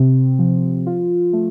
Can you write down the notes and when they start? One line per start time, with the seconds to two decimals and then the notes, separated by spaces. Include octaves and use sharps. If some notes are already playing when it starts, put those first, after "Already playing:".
Already playing: C3 C4
0.39 F3
0.87 F4
1.33 A3